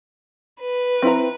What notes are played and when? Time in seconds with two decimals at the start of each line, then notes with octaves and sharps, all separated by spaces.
0.61 B4
1.02 C4 E4 A#5